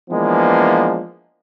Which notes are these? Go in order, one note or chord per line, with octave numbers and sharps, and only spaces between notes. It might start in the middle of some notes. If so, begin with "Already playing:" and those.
E3 F3 G#3 A#3 B3 D4